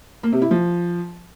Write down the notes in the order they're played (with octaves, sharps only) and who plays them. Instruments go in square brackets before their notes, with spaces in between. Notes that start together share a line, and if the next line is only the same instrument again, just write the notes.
[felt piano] A#3
C3
E4
F3